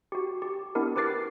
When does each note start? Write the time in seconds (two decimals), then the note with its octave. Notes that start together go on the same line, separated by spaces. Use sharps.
0.12 F#4 G4
0.42 G4
0.75 B3 D4 E4 G4 A#4
0.96 G4 A#4 B4 D6 A6 C7